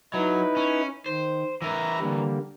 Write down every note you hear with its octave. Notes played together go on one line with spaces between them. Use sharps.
F#3 D#4 E4 B4
C#4
D#3 C5
E3 A#4 E5 A#5
D3 G3 A#3